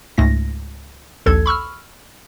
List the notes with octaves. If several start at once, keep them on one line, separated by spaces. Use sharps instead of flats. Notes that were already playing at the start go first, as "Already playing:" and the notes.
C#2 G#2 A3 A#6
A#1 D#2 A4 G#6
B5 C#6 E6 F6